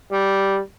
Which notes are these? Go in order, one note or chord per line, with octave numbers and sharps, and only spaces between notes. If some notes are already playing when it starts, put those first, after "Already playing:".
G3